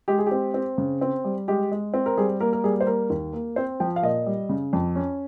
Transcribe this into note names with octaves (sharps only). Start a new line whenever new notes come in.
G#3 G4
G#4
C4 G4
C4
C#3
C4
G3
G#3 G4
G#3
C4
A#4
G3 G#4
A#3 A#4
A#4
G3 G#4
C5
A#3 A#4
D#2
A#3
C4 C5
F3 G5
F5
A#2 D#5
G3
C#3
F2
C#4